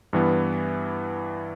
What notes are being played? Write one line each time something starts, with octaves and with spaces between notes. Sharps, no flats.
G2 E3 B3